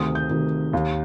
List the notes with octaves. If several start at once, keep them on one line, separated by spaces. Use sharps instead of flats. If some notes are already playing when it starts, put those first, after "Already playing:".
Already playing: D2 C3 D#3 D#6
G6
D2 C3 D#3
D#2 D#3